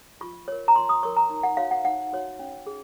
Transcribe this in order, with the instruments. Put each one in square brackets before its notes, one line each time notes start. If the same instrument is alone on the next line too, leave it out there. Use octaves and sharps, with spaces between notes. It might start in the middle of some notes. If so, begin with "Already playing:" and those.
[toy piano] F4 C#6
A#4 C#5
A#5
F4 C6
D#6
A#4 C#5 C#6
A#5
D#4
F#5
F#4 C#5 F5
F#5
D#4 F#5
F#4 C#5
C#4
G#4